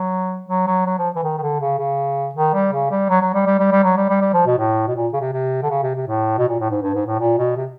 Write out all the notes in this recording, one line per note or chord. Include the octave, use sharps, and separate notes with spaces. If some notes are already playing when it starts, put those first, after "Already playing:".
Already playing: F#3
F#3
F#3
F#3
F3
E3
D#3
D#3
D3
C#3
C#3
D#3
G3
C#3
G3
F#3
F#3
G3
G3
G3
G3
F#3
G3
G3
G3
F3
B2
A2
B2
A#2
C#3
C3
C3
D3
C#3
C3
C3
A2
B2
A#2
A2
G#2
G2
G#2
A2
A#2
B2
C3